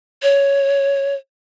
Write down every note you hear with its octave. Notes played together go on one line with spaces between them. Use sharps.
C#5